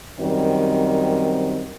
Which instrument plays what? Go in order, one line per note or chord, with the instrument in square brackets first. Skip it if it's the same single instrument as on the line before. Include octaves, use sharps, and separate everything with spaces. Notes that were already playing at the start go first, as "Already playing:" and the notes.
[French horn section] F#2 D#3 G3 C4